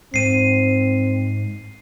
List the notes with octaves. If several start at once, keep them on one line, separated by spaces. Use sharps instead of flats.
G#2 C4 C7 D#7